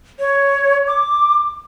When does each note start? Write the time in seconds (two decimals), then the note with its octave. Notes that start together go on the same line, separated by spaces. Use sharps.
0.19 C#5
0.87 D6